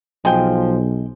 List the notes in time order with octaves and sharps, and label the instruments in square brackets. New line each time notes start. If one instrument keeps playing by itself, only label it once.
[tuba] B1 [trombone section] F3 [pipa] G#3 G5